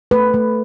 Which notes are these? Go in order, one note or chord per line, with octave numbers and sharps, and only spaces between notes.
A3 B4
A3